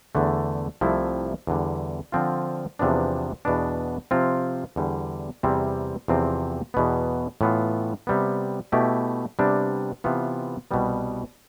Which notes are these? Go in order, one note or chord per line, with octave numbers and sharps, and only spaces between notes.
E2 D3 A3
C2 C3 F3 A3 E4
E2 D3 G3
D3 F3 C4 F4
E2 C3 F3 B3 D4
E2 B2 B3 D4
C3 F3 C4 F4
E2 D3 G3
E2 C3 G3 C4 E4
E2 C3 F3 C4
E2 B2 B3
A2 E3 B3 F4
C3 G3 B3
B2 A3 E4 G4
C3 G3 B3 D4
C3 E3 B3 F4
C2 B2 G3 B3